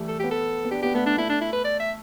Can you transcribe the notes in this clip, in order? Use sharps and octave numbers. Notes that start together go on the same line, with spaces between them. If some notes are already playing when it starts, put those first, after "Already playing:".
Already playing: E3 G3 A3
A4
B3 G4
A4
B3
D4 G4
B3 G4
A3 B3
D4
A3 E4
D4
E4
B4
D5
E5